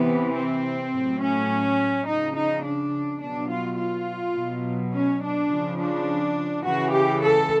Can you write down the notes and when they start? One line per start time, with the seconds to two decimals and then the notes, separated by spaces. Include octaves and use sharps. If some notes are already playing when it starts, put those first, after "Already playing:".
Already playing: C3 E3 B3
0.36 C4
0.93 A2 F#3
1.21 C#4
2.07 C#3 F3 D#4
2.36 D#4
2.64 D4
3.21 B2 F#3 D4
3.51 F4
3.79 F4
4.36 B2 F#3
4.94 C#4
5.22 D4
5.50 C#3 F3
5.78 D4
6.64 C#3 E3 F#4
6.92 G4
7.21 A4